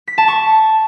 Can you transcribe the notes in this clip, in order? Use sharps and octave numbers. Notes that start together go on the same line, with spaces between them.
B6
A5
C#6